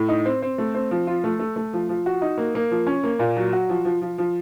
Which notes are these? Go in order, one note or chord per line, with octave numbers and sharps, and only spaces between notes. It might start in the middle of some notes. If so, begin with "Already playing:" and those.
Already playing: A2
D#4
C4
C4
A3
C4
F3
F4
A3
A3
A3
F3
F3
F#4
D#4
A#3
A#3
F3
C#4
A#3
A#2
F#3
F#4
F3
F3
F3
F3